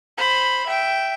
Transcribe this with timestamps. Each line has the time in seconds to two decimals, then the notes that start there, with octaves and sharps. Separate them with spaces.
0.17 C5 B5
0.66 E5 G5